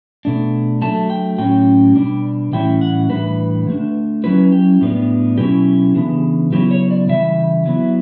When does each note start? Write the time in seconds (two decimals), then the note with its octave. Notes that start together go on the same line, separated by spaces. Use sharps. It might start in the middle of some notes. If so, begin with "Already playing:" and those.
0.25 B2 A3 D4
0.82 D3 F#3 A3 A5
1.10 G5
1.38 A2 F#3 C#4 G5
1.95 B2 G3 D4
2.53 A2 E3 G3 C#4 E4 G5
2.81 F#5
3.09 A2 E3 G3 D4 B4
3.67 D3 A3 D4
4.24 F#3 C#4 E4 B4
4.52 G4
4.81 A2 G3 B3 D4
5.38 B2 F#3 C#4 E4 G4
5.95 C#3 E3 B3 D4
6.52 C#3 F#3 B3 E4 G4
6.71 C#5
6.91 D5
7.09 C#3 E3 G3 E5
7.66 F#3 B3 E4